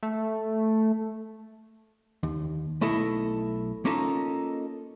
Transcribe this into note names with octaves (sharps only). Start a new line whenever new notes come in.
A3
D#2
B1 A3 E4 A4 D#5
A#3 C#4 D#4 F4 A4